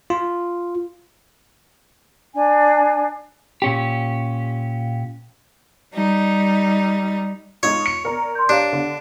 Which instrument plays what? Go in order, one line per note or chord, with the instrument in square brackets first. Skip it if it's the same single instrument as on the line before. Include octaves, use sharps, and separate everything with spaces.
[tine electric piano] F4
[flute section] D4 G#5
[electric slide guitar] A#2 C#4 G4
[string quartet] G3 D#4
[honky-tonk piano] G#3 D#4 F4 [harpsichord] C#5
[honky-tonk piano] C#7
A#4 D5 A#5
[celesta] C6 G6
[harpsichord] D4 [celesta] G4 C#5 F5
[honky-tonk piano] D3